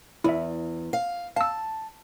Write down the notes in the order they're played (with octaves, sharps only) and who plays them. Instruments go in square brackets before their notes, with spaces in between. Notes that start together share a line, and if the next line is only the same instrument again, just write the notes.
[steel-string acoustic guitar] E2 [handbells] E4 E5
[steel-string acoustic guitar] F5
[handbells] F5 E6 [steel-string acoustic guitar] A5